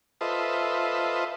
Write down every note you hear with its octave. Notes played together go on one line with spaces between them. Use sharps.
F4 A4 B4 C5 D#5 E5